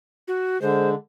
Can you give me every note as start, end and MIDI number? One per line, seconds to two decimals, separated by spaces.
0.28 0.60 66
0.61 0.95 50
0.61 0.94 56
0.61 0.89 72